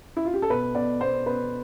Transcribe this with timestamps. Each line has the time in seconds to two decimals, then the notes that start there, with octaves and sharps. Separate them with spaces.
0.17 E4
0.25 F4
0.34 G4
0.42 A4
0.50 B2 B4
0.75 B2 D5
1.01 B2 C5
1.26 B2 B4